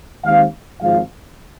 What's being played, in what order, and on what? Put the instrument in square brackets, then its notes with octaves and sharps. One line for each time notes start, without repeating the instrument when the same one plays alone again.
[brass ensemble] D#2 D#3 G#3 C4 F5
G#1 G#2 F3 F5